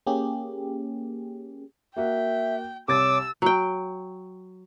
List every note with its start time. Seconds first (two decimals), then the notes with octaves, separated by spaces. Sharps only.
0.07 A#3 C#4 G4 G#4
1.96 A#3 F#4 E5 G5
2.88 C2 C#5 D6 E6 A6
3.42 F#3 G5